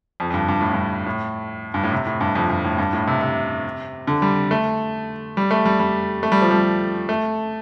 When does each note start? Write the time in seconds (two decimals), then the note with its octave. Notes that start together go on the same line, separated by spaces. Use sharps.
0.20 F2
0.30 F2
0.34 G2
0.48 G2
0.60 A2
0.74 G2
1.06 A2
1.74 G2
1.83 A2
1.92 C3
2.06 A2
2.21 G2
2.35 F2
2.50 G2
2.64 A2
2.78 G2
2.93 A2
3.08 C3
3.21 C3
4.07 D3
4.22 G3
4.51 A3
5.37 G3
5.51 A3
5.65 G3
5.80 G3
6.23 A3
6.32 G3
6.42 F3
6.51 G3
7.09 A3